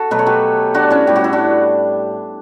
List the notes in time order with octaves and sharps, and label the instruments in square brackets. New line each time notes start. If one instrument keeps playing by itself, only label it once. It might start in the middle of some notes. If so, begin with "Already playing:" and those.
Already playing: [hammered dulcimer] F#4 A4
B2 F#3 A3 B4
C#5
G4 B4
D4 F#4
C#4 E4
A2 G3 G4
F#4
E4
D4 F#4